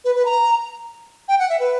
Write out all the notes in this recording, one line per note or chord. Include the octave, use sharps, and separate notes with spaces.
B4
B4
A#5
G5
F#5
E5
B4